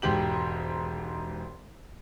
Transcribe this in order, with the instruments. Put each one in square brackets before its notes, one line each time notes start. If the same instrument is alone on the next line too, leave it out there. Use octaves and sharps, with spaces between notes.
[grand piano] E1 G#2 G4 F#7